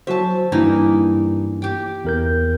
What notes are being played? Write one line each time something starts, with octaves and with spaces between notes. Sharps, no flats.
F#3 F#4 C5 E5 A5
G2 E3 A#3 D#4
G4 G5
E2 A#4 G6